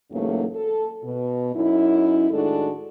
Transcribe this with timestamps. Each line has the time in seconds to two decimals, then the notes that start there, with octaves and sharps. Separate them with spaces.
0.11 E2 G#2 C#3 F#3 A3 A#3
0.55 A4
1.04 B2
1.54 F#2 C#4 D#4 E4
2.31 A2 D#3 G#3 D4 F#4 A4